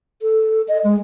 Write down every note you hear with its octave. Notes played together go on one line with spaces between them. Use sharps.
A4
D#5
G#3